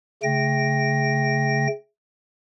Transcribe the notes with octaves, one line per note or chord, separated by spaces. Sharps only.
C#3 A3 G5 A#6